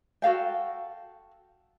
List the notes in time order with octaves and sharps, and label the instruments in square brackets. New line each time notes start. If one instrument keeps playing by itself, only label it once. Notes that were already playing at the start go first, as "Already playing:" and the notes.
[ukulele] F#4 A4 F5 G5